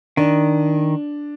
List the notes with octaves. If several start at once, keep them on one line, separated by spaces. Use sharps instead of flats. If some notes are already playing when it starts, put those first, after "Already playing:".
D#3 D4